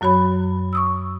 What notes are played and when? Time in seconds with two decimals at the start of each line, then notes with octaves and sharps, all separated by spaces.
0.01 F#2 F#3 F#4 C#5 B5
0.73 C#6 D#6 E6